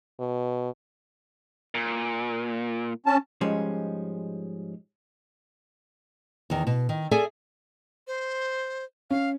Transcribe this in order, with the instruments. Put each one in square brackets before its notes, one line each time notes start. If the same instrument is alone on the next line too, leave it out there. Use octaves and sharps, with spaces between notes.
[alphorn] B2
[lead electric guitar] A#2
[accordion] C#4 A5
[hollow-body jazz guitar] G#2 F3 G3 G#3 C#4
[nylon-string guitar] E2 D#3
B2
D#3
G#4 A4 D5 E5 G#5
[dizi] C5
[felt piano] C#4 [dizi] F5